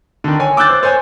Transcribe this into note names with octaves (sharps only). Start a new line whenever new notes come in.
D3 D#3
C#5 G#5
D6 E6 F#6 G6 A6
C5
C5 C#5 G#5 G6